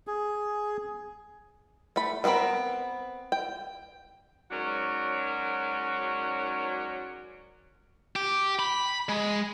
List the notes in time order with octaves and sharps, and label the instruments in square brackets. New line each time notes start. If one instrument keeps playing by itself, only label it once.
[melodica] G#4
[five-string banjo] A3 B5
D#3 B3 C4 A#4 B5
G5
[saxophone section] G#2 F#3 C#4 A#4 D5 F#5
[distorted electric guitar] G4
B5
G#3